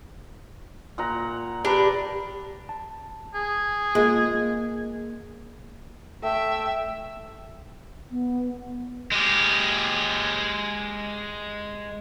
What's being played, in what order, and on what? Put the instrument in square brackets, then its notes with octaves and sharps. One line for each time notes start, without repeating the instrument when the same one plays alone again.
[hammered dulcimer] A#2 F#5 A#5
[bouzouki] D4 G4 [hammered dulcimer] A#4 B4
[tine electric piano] A5
[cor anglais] G#4
[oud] G#3 [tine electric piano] A#3 F4
[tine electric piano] A#3
[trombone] A3 [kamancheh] E5 G5
[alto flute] B3
[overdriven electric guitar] G#3 G4